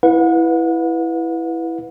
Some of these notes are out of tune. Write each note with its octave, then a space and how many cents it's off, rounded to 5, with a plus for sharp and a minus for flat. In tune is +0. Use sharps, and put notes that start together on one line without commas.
E4 +0 B4 +0 F#5 -40